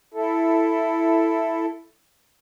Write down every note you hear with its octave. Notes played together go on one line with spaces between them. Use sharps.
E4 A4